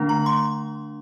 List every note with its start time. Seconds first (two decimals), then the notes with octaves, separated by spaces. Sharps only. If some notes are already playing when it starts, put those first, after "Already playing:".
Already playing: D3 A3 D4
0.09 A#5
0.26 C6